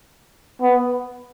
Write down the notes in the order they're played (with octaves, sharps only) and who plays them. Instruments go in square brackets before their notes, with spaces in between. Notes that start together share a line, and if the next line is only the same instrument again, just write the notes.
[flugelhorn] B3